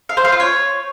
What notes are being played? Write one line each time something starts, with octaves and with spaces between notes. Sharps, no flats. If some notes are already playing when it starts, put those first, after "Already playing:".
F5
C5
F5
F4
C#5